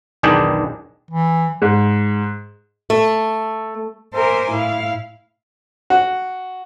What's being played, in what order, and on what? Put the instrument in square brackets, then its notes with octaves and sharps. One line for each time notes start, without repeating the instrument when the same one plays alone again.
[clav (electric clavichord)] B1 E2 D#3 D4 G#4 G5
[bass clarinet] E3
[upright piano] G#2
[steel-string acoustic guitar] A3
[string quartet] A#4 C5 E5 G#5 C6 D6
A2 E4 F5
[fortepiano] F#4